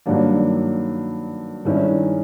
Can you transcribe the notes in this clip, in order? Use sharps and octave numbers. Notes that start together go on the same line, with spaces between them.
G2 D#3 F#3 A#3 D4
G2 D#3 G#3 C#4 E4